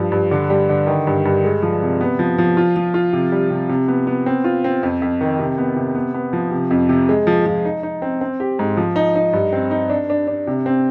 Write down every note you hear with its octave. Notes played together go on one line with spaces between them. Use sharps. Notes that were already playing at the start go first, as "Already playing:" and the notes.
Already playing: G2 F3
G2
D3
G3
D3
D#3
G2
G2
G#3
F3
C3
B3
F3
F3
F4
F3
F4
C3
G3
C3
C3
B3
B3
C4
F4
C4
F2
F2
D#3
C3
B3
C3
B3
B3
F3
C3
F2
C3
G#3
F3
F3
D#4
D#4
C4
C4
G4
G#2
F3
D#4
D#4
G2
C4
D#4
D4
D4
D4
C3
C4